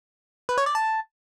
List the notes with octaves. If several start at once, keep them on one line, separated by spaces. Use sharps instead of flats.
B4
C#5
D5
A5